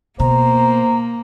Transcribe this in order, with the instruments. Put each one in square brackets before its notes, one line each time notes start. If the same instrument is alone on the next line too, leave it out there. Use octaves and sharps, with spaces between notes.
[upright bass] B2 [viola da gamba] A#3 [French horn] C5 [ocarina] A#5